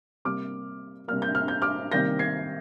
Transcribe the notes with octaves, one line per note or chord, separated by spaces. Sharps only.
C3 G3 A#3 D6 F6
C3 G3 A#3 F6
G6
F6
G6
D6 F6
C3 D#3 G3 A#3 G6 A#6
G#6 C7